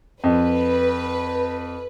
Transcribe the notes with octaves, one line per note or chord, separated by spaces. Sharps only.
F2 B4